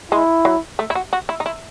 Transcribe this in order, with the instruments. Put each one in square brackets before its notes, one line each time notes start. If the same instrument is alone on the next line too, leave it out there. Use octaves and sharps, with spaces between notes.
[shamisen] G#3 [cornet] E4
[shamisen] F#3
A3
E4
F#4
F#4
E4
D#4
E4